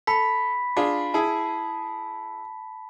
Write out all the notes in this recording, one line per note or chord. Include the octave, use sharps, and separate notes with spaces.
A4 B5 B6
D4 F4 G#4
E4 G#4 A5